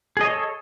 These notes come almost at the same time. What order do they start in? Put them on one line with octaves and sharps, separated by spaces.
G#4 D#5 C#5 A4